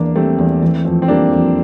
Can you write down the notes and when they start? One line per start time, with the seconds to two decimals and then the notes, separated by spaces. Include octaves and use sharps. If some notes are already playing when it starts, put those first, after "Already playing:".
Already playing: E2 E3 A#3 D4
0.15 G3 A3 C4
0.38 E2
0.62 E3
0.85 F2
1.02 C4
1.08 G3 A#3 D4
1.32 F2